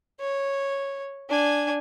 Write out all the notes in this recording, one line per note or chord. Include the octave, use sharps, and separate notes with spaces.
C#5
D4 G#5